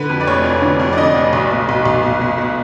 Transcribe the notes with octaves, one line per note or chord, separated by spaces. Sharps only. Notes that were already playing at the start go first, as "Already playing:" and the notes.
Already playing: D3 B4
F2
D5
F1 C#5
F2
D3
F2
D5
D3 D#5
F1
B1
B2
B1
B1
B2
B2
B2